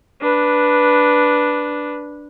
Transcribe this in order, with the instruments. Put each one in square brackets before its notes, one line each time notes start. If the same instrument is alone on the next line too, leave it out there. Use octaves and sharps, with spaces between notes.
[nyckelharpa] D4 B4